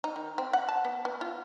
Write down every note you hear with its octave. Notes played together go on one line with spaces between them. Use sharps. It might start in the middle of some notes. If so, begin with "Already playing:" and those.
D#4
D#3
C4
F#5
A5
B3
B3
F4